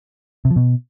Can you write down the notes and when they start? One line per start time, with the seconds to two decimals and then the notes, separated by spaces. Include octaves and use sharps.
0.45 C3
0.51 F3
0.56 B2